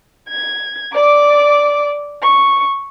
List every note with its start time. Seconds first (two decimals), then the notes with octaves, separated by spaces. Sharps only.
0.29 G#6
0.94 D5 D6
2.23 C#6